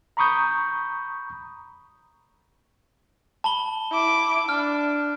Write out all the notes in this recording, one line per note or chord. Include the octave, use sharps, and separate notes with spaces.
A#5 B5 C#6 D#6 G6
A5 B5 G7
E4 D6
D4 F6